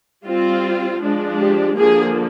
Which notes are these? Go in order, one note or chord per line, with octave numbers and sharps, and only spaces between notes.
G3 C4 F4
F3 G#3 D4
G4
D3 F3 A#3 G#4